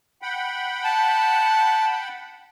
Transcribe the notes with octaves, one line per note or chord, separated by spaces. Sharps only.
F#5 G5 B5
A5